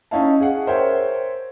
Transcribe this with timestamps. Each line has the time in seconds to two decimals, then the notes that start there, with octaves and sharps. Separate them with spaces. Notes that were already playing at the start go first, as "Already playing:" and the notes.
0.11 C#4 D#4 E4 D#5 F5 A5
0.40 G#4 F5 F#5
0.67 A#4 C5 C#5 E5 G5